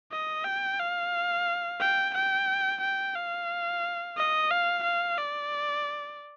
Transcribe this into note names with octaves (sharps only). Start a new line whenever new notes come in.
D#5
G5
F5
G5
G5
G5
F5
D#5
F5
F5
D5